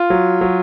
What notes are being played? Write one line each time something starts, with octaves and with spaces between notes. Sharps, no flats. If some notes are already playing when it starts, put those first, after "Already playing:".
Already playing: F4
F#3
F#3